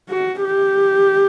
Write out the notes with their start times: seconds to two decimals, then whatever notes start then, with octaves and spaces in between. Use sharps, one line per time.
0.09 F#4
0.44 G4